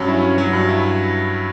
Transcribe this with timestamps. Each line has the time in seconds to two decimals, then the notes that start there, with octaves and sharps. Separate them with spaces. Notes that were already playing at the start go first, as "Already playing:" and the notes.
Already playing: G2 F#3 C#4
0.08 E4
0.22 C#4
0.38 F#3
0.53 G2
0.68 E4